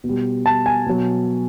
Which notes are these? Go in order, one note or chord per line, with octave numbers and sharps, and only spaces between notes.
B2
G3
A5
G#5
B2 F#3